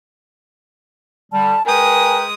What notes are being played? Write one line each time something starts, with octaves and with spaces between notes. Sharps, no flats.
D3 G3 A5
G#3 A#4 B4 G5 G#5 D#6